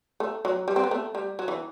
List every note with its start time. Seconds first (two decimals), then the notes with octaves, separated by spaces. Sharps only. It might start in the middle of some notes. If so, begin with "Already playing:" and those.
0.20 A3
0.45 F#3
0.68 G3
0.76 C4
0.84 B3
0.91 A3
1.15 G3
1.39 F#3
1.48 E3